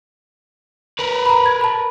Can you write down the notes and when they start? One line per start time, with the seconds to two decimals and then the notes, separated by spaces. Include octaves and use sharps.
0.99 A#4 B4
1.26 A#5 B5
1.46 G#6
1.61 A5 B5